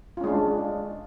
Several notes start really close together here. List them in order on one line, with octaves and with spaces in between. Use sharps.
F4 C#4 G#3 D4